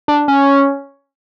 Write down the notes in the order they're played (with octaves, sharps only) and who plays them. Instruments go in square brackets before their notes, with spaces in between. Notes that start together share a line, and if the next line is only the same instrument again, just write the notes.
[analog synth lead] D4
C#4